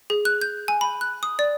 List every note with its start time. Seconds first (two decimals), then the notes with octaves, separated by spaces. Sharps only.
0.10 G#4
0.25 F#6
0.41 G6
0.68 G#5
0.81 B5
1.01 F#6
1.23 D#6
1.39 D5